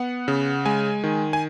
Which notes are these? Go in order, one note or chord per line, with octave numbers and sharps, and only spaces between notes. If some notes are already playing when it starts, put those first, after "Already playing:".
Already playing: B3 F#5
C#3
G#3 G#5
D#3
G#5